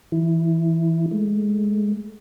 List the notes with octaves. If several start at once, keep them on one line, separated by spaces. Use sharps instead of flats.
E3 E4
G#3 A3